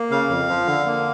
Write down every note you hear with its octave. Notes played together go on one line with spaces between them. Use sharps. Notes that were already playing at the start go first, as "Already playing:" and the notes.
Already playing: A#3
C#3 F5
F2
F3
D3
A#3